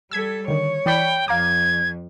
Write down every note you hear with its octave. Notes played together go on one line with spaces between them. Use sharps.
G3 A4 E6 G#6 B6
D3 D#3 C#5
E3 D5 G5 B5
F2 F5 A#5 D6 G#6